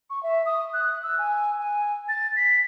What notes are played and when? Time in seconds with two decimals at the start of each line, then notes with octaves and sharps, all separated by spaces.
0.10 C#6
0.23 E5
0.46 D#6
0.74 F#6
1.03 E6
1.19 G#5
1.59 G#5
2.09 A6
2.37 B6